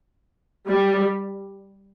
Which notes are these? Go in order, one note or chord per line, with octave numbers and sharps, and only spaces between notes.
G3